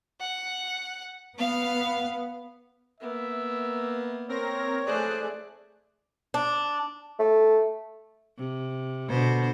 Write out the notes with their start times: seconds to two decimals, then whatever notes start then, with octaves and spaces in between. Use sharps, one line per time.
0.21 F#5
1.38 B3 F5
3.00 A#3 B3 E5
4.29 C4 A#4 C#5 A#6
4.87 A3 G#4 C5 D5 F#6
6.34 D4
7.19 A3
8.38 C3
9.10 B2 D3 C5